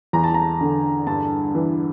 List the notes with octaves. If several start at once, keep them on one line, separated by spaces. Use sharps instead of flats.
E2 A#5
A5
A#5
D3
G2 A5
E3